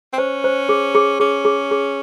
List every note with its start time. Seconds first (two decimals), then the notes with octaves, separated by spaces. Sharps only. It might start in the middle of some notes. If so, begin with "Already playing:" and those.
0.13 C4
0.18 C#4 C5
0.44 C5
0.69 G#4
0.95 G#4
1.20 C#4 G#4
1.45 G#4
1.71 G#4